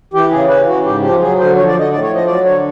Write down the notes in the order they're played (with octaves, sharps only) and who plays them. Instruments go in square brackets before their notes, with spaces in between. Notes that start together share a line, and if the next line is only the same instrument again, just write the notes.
[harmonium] E3 G4
C#3 G#4
E3 B4
C#3 F#4
G#2 G4
F3 G4
F#3 G#4
D3 C5
F3 C#5
D5
D3
D#5
A2 D5
C#5
F3
D#5
F#3 D5
D3 C#5